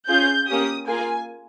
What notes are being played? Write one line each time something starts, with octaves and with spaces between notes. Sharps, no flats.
C#4 F4 G#4 G6
A#3 C#4 G4 D#6
A#3 F4 G#4 G#5